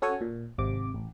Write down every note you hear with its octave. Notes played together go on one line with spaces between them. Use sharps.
C#4 F#4 A4 C#5 F#5 G#5
A#2
G#1 C3 D6
A1